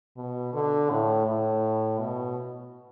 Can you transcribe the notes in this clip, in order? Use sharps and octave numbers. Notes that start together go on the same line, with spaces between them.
B2
D3
A2
A2
B2